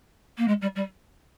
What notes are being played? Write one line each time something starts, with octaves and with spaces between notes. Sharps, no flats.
A#3
G#3
G3
G3